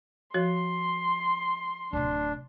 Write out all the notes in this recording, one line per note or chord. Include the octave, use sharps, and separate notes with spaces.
F3 F#4 C#5 C6
D1 C3 D4